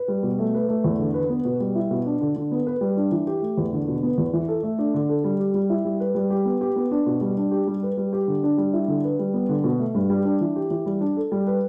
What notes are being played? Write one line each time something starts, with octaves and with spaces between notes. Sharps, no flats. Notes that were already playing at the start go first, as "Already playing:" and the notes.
Already playing: B4
G3
B2
A3
B4
A3
E2
D3
B4
B3
B2
G3
E4
B2
D4
D3
D3
B3
B4
G3
D4
E3
G4
A3
E2
D3
B2
B3
E2
E3
A4
A3
D4
D3
A4
G3
G4
G3
E4
G3
B4
G3
G4
B3
G4
B3
D4
B2
G3
D4
G4
G3
B4
G3
G4
D3
D4
G3
E4
D3
B4
G3
B3
D3
B2
A3
G2
G3
D4
E3
G4
E3
G3
D4
A4
G3
B4